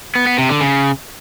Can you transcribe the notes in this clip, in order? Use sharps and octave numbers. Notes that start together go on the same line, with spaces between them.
B3
B3
C3
D3
C#3